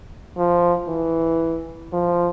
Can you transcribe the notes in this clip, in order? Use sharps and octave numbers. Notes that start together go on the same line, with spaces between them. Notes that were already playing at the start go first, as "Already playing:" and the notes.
F3
E3
F3